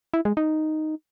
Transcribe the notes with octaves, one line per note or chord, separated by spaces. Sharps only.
E4
G#3
D#4